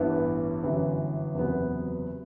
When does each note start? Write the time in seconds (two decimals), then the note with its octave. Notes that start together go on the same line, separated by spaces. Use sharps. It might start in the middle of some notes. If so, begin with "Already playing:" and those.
Already playing: A1 G2 E3 B3 E4
0.63 G1 F#2 E3
1.35 F#1 E2 C3 F#3 B3